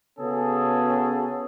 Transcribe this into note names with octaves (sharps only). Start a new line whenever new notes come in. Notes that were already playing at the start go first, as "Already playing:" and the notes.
C#3 B3 C#4 F#4 G#4 A4